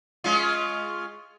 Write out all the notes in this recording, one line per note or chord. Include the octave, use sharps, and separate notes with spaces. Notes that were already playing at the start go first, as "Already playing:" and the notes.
G#3 C#4 F4